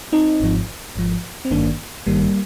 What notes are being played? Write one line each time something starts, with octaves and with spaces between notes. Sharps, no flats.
C4 D#4
G#1 G#2 F3
G#1 G#2 F3
C4
G#1 G2 D#3 A#3 D4
G#1 G2 D#3 G3 A#3